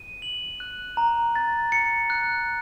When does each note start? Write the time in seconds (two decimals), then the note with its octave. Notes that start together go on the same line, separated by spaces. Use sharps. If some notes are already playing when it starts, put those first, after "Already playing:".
Already playing: D#7
0.22 F#7
0.60 F#6
0.97 A#5
1.36 A6
1.72 C#7
2.10 F#6